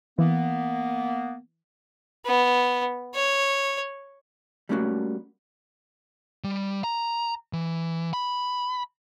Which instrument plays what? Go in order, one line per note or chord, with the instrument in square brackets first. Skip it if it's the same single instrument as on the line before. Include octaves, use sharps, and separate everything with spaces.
[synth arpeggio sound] E3 [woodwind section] A#3 B3
[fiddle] B3
C#5
[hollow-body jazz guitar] G3 A3 A#3 C#4 D4 F#4
[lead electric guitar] G3
A#5
E3
B5